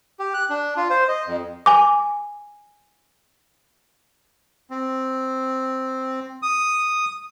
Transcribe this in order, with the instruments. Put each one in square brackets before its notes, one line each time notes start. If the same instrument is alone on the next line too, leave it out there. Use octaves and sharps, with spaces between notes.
[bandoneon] G4
F#6
D4
F4
C5
D#5
F2
[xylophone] G#5 D6
[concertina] C4
D#6